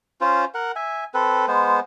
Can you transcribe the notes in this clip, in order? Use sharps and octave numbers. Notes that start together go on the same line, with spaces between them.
C#4 F4 C5
A#4 F#5
E5 G#5
C4 A4 B4
G#3 B3 C5